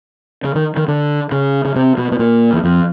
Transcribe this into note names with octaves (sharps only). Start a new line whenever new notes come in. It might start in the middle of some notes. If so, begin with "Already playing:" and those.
C#3
D#3
D#3
D3
C#3
C#3
C3
B2
B2
A#2
E2
F2